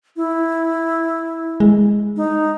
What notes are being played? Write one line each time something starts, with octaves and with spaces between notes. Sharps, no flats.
E4
G#3
D#4